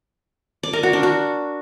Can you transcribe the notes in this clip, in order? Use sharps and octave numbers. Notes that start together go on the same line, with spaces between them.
D5
A#4
F#4
D4
F#4